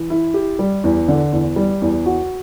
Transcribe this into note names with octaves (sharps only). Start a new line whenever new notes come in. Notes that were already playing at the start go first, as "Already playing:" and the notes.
Already playing: E3
E4
G4
G3
E2
D3
E2
G3
E2
F#4